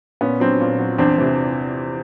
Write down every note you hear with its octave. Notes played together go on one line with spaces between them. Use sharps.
A#2 B3 C#4
F#3 C4 D4
A#2
F#3
E2 C4 D4
C3 E3